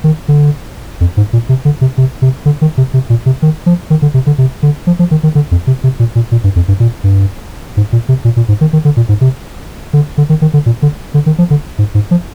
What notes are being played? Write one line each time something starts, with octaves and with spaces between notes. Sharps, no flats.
D#3
D3
F2
G#2
A#2
C3
D3
C3
C3
C3
D3
D#3
C3
C3
A#2
C3
D#3
F3
D#3
D3
C3
D3
C3
D3
F3
F3
D#3
D#3
D3
F2
C3
C3
A#2
A#2
A#2
G2
F2
G2
A#2
G2
G#2
A#2
C3
A#2
A#2
G#2
D#3
D#3
D3
A#2
G#2
C3
D3
D3
D#3
D#3
D3
A#2
D3
D3
D#3
F3
D3
G#2
G#2
F3